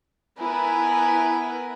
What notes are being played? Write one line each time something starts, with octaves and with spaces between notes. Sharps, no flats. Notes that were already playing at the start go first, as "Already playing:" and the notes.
B3 E4 A#4 B4 G#5